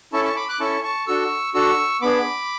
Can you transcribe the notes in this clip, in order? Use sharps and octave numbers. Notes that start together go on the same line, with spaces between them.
C#4 E4 A4 A5 C#6
A5 C#6
B5 D6
D6 F#6
C#4 E4 A4 A5 C#6
A5 C#6
D4 F#4 A4 C#6 E6
D4 F#4 A4 C#6 E6
B3 D4 G#4 B5 D6